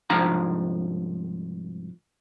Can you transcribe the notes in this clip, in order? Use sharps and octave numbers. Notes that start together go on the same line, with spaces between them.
C2 G#2 F3 D4 F5 A#5